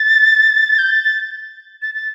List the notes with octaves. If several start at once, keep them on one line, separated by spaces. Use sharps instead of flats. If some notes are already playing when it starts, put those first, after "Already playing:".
Already playing: A6
G6
A6
A6
A6
A6